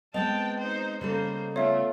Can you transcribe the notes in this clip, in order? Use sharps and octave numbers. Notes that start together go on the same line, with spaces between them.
G#3 B3 C4 D#5 G5 A5
D#4 C5
C#3 G3 A#3 A4 C5
A3 B3 F4 C#5 E5 F5